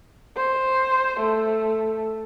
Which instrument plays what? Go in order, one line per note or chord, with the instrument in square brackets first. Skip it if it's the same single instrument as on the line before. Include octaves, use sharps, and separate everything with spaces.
[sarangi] C5
A3